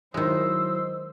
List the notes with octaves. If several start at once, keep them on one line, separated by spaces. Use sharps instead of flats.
D#3 F#3 G#3 E4 C5 D#5 E6